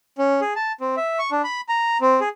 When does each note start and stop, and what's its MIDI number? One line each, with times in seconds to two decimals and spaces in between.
0.18 0.40 61
0.41 0.53 68
0.56 0.72 81
0.81 0.95 60
0.97 1.19 76
1.19 1.30 85
1.32 1.42 62
1.44 1.61 83
1.69 1.97 82
2.01 2.20 60
2.21 2.29 68